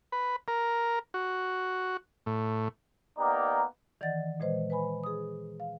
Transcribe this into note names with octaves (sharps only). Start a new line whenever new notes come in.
B4
A#4
F#4
A2
A#3 B3 D#4 G4 D5 A#5
D#3 E3 D5 D#5 F#5 A6
A#2 E3 G#3 B4 C5 D#5
B4 C5 G#5 B5
G#4 D#6
F5